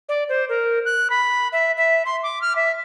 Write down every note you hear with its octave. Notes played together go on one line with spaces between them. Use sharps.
D5
C5
A#4
F#6
B5
E5
E5
C6
D6
F6
E5